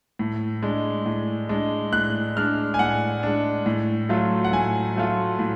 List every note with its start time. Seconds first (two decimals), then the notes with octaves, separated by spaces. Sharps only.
0.19 A2
0.62 G#3 D4
1.06 A2
1.49 G#3 D4
1.93 A2 F#6
2.37 G#3 D4 F6
2.74 G#5
2.79 A2 F#5
3.23 G#3 D4
3.66 A2
4.09 F#3 A3 F4
4.44 F#5
4.53 A2 G#5
4.96 F#3 A3 F4
5.39 A2